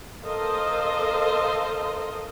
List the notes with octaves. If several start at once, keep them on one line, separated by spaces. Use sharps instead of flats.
A4 A#4 C5 D#5 F5